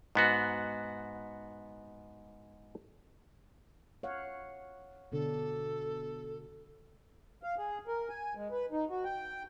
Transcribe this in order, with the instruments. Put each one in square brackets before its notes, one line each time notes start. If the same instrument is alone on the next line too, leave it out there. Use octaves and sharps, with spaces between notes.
[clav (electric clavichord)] G#2 B3 F#4
[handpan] C#5 F5 F#5
[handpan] B2 D3 D4 [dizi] A4
[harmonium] F5
G#4
A#4
G#5
G#3
B4
D#4
F#4
G5